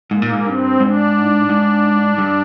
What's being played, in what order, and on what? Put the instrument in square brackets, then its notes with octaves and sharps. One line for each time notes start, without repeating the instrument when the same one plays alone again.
[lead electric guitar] G#2 [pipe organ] A#3
[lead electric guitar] A#2
G#2
[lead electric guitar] G2 [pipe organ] C4
[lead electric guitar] G#2 [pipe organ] D4
[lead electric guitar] G#2
G2